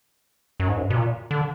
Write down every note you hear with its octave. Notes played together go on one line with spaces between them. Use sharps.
F#2
G#2
F#2
B2
A#2
D3